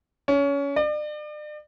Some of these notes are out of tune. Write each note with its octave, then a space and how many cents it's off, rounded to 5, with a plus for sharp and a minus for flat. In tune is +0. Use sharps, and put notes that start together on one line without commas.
C#4 +25
D5 +40